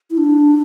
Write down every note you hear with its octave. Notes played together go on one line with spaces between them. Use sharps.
E4
D4